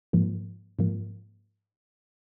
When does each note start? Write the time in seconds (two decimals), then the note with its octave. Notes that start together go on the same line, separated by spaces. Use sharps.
0.13 G#2 F3 A#3
0.79 G#2 F3 A#3